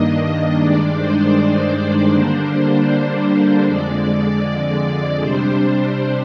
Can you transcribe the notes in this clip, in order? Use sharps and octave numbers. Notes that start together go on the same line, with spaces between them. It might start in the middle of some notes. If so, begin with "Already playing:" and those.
Already playing: G2 D#3 A#3 D4 D#5
G2 D#3 G#3 D4 D5
C5
C5
D3 G3 A#3 D4
F2 D3 G#3 D5
C3 G3 D4 C5